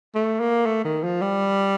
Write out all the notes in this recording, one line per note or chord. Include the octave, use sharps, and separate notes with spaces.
A3
A#3
A3
D#3
F3
G3